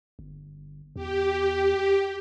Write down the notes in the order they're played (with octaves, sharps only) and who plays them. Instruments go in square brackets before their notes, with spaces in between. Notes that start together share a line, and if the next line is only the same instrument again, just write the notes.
[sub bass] G1
[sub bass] E2 [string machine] G4